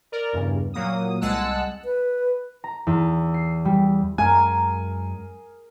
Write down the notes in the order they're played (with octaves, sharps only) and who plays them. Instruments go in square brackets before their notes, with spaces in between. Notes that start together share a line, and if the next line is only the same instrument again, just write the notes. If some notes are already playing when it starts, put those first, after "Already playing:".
[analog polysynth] A#4 D5
E2 G2 C#3
A#2 F#3 A#3 D#6
C2 G#3 F#5 A5 E6 F#6
[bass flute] B4
[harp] A#5
E2
C7
G3
[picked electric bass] F#2 G#3 [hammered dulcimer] G#4 A#4 A#5 [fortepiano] G#5